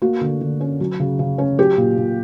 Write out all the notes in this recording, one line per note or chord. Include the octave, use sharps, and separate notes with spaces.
A#3 F#4
D3
D3
C#4
F#3
C#3
C#3
C#4
F#3 G4
A#2
A#2